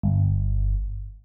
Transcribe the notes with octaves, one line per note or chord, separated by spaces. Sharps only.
G1